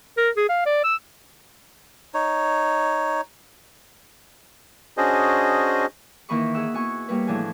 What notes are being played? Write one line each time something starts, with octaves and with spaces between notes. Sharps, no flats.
A#4
G#4
F5
D5
E6
D#4 C#5
C#4 D4 F#4 G#4 C5 D#5
D#3 E3 A#3 D#5 B5 C#6
G#4 D#5 F#5 E6 F#6
B3 F#4 G#5 C#6
G3 A#3 B4 C#5
A2 E3 F3 D4 G#5